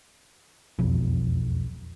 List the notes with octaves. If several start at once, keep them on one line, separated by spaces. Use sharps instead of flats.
E1 B1 F2